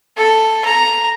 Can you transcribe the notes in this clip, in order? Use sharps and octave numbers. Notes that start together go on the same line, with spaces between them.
A4
A#5